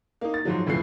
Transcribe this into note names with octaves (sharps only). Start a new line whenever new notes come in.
A#3 D#4
A6
G#2 F3 F#3
F1 C#2 A2 E3 F3 C7